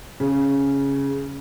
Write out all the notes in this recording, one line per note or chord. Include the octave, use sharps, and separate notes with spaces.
C#3